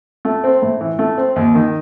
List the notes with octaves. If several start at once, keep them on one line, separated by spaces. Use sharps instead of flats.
A3
C4
A2
E3
A3
C4
D#2
D#3